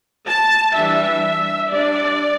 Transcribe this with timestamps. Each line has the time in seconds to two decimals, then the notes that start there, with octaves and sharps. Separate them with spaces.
0.28 A5
0.76 E3 G3 D4 E5
1.71 G3 D4 D5